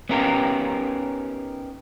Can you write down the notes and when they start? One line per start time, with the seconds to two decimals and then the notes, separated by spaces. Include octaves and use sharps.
0.09 B3 C#4 D#4 G4 A#4